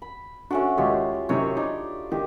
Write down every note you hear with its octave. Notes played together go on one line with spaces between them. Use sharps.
B5
A3 C#4 D4 F#4
D#2 G#3 F4 G4
F#2 C3 D#3 C#5
D4 D#4
D#3 G4